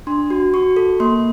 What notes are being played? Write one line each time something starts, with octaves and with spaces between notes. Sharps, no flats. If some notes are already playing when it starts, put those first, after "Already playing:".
D4 C6
F#4
F#4 C#6
A4
A#3 C6